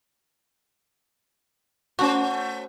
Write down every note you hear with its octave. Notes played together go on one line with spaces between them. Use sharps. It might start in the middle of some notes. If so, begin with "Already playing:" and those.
A3 C#4 F#4 C5